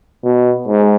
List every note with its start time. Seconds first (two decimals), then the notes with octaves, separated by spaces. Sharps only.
0.24 B2
0.68 G#2